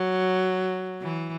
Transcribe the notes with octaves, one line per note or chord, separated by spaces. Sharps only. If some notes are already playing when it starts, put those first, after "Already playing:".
Already playing: F#3
E3